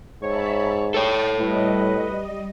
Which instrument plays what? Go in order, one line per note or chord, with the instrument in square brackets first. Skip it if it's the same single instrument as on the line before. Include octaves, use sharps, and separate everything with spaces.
[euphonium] G#2 [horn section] C#5 [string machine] E5 A5 B5
[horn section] G3 G4 G5 [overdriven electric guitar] A4 C#5 [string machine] A6 C7
[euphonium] A2 [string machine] G3 D#5 [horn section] E4 F#4 B4